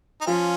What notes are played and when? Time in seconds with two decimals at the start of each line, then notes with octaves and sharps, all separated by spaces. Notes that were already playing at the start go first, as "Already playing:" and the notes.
0.21 D#4
0.26 F3 C#4 F4